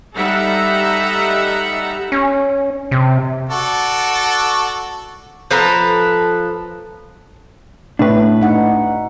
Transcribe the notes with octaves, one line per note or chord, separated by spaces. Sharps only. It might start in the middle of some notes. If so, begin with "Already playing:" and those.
G3 D#4 A4 E5 F#5
C#4
C3
F#4 A4 D5
F3 A4 B4 A#5
A2 D4 B4
D#4 F#5